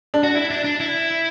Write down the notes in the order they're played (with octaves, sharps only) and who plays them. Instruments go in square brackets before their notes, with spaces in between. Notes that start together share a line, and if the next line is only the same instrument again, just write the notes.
[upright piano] D4
[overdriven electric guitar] F#4
E4
D4
D4
E4